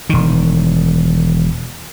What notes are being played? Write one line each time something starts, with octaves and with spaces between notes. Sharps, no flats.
E1 D#3